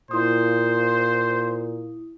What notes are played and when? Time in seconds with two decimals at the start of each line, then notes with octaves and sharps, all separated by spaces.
0.11 A#2 E4 C5 D#6